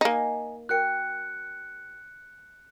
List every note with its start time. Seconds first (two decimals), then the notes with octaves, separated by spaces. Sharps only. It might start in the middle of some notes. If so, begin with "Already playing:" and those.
0.01 A#3 D#4 D#5 G#5
0.69 F#4 A#4 G5 F#6 C#7